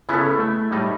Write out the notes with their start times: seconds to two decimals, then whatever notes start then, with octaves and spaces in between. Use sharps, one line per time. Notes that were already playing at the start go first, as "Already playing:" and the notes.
0.09 C#3 B3 C#4 E4 G#4 A4
0.39 A3
0.71 A2 G3 D#4